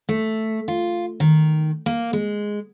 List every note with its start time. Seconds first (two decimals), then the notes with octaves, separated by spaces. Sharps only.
0.09 A3
0.68 F4
1.20 D#3
1.86 A#3
2.13 G#3